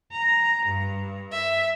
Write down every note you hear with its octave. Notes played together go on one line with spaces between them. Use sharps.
A#5
G2
E5